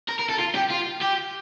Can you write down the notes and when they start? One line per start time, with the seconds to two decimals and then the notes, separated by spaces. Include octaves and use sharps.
0.09 A#4
0.19 A#4
0.30 A4
0.39 F4
0.55 G4
0.71 F4
1.02 G4